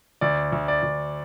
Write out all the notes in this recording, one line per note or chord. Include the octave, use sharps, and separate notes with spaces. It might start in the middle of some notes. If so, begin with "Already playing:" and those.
D2 D5
D2
D5
D2